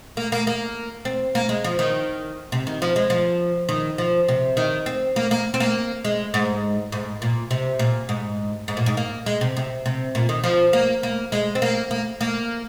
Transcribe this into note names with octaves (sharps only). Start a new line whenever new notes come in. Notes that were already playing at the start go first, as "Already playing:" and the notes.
A#3
A#3
A#3
C4
A#3
G#3
F3
D#3
C3
D#3
F3
G#3
F3
D#3
F3
C3
D#3
C4
A#3
A#3
C4
A#3
G#3
G#2
G#2
A#2
C3
A#2
G#2
G#2
A#2
G#2
A#3
G#3
C3
C3
C3
A#2
D#3
F3
A#3
A#3
G#3
C4
A#3
A#3
A#3